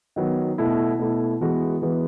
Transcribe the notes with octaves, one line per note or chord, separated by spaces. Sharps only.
D#3 F#3 B3
B2 A3 E4
B2 A3 E4
E3 G#3 B3 F#4 B4
E3 G#3 B3 F#4 B4